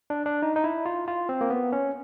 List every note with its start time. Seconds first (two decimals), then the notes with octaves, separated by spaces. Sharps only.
0.10 D4
0.26 D4
0.42 D#4
0.56 D#4
0.64 E4
0.86 F4
1.08 F4
1.29 C4
1.41 A#3
1.50 B3
1.73 C#4